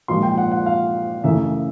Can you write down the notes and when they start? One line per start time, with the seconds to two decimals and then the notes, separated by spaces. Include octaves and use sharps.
0.08 A#2 F3 G#3 C6
0.23 G5
0.37 F#5
0.52 F#5
0.66 F5
1.24 F#2 C#3 E3 A3 E5